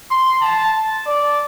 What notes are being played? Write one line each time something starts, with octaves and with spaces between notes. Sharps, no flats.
C6
A5
D5